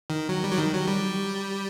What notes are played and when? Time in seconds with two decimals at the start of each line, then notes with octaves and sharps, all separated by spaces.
0.10 D#3
0.29 F#3
0.44 G3
0.52 F#3
0.58 D#3
0.73 F#3
0.87 G3